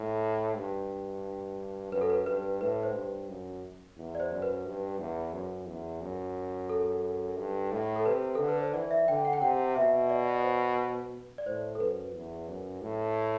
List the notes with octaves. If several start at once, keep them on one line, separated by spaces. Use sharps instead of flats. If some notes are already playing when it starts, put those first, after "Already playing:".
Already playing: A2
G2
F#2 B4
A4
B4
G2 B4
A2 B4
C5
G2
F#2
E2
D5
C5
F#2
B4
G2
E2
F#2
E2
F#2
A4
G2
A2
A4
C3 B4
D3 A4
B4
C5
E3 D5
E5
D3 G5
F#5
G5
C3 F#5
B2 E5
D5
C5
D5
A2 C5
A4
F#2 B4
E2
F#2
A2